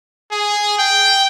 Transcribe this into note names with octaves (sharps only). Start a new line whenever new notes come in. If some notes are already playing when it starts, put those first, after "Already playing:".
G#4
G5